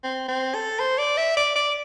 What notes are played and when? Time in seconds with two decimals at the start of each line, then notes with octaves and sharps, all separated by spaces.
0.04 C4
0.28 C4
0.55 A4
0.80 C5
0.98 D5
1.17 E5
1.37 D5
1.56 D5